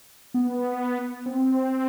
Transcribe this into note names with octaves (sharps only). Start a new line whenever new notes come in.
B3
C4